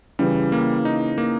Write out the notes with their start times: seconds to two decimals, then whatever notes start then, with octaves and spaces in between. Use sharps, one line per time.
0.19 C#3 E3 G3
0.52 A#3
0.85 D#4
1.18 A#3